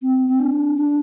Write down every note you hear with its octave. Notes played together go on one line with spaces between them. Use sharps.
C4
C4
D4
D4